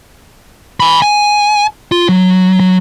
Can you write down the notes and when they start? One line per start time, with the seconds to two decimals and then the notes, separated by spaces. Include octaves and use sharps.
0.80 G#5 B5
1.02 G#5
1.92 F4
2.09 F#3
2.60 F#3